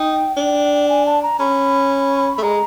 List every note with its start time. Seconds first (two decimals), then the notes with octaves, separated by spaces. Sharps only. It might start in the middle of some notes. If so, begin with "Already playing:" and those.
Already playing: D#4 G5
0.37 D4
0.89 G#5
1.06 A5
1.22 A#5
1.40 C#4 B5
2.38 A3
2.43 G#3 A#5